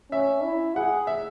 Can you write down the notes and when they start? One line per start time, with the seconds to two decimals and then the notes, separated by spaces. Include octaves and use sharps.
0.12 C#4 E5
0.44 E4
0.76 G#4 F#5
1.07 E5